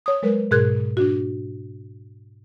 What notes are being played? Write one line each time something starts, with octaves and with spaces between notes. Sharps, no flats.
C#5 D#6
F#3 G#3 A#4 B4
G#2 B2 G#4 A#4 F#6 G#6
D4 F#4